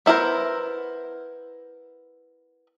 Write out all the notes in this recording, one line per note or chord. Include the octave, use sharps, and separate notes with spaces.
B3 E4 G#4 A#4 C5